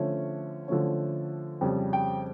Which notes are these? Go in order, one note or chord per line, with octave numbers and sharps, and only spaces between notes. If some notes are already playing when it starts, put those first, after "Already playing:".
Already playing: D3 F3 A3 C#4
D3 F3 A3 C#4
F2 C#3 G3
G5